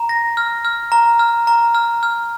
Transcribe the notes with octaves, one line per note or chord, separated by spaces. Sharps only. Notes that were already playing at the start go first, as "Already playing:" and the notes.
Already playing: A#5
A#6
F6
F6
A#5
F6
A#5
F6
F6